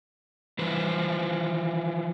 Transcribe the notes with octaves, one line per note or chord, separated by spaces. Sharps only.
E3 F3 B4 C5